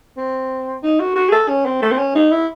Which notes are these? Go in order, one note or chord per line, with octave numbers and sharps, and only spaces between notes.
C4
D#4
F#4
F#4
G#4
A4
C#4
C4
A3
C4
C#4
D#4
E4